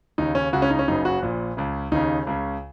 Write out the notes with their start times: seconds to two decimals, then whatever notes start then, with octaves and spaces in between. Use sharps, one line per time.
0.18 D#2 C#3 D#4
0.35 C#4
0.52 C#2 C#3 F#4
0.62 C#4
0.71 D#4
0.79 C#4
0.88 F#1 F#2 C#3 D#4
1.05 F#4
1.22 A#1 A#2
1.57 C#2 C#3
1.92 D#2 C#3 D#4
2.27 C#2 C#3